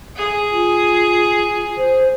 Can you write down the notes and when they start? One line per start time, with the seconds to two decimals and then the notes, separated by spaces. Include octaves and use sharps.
0.17 G#4
0.51 F4
1.77 C5